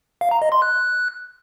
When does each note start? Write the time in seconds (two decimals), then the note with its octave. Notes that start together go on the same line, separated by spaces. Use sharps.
0.21 F5
0.31 A#5
0.42 D#5
0.52 C6
0.62 F#6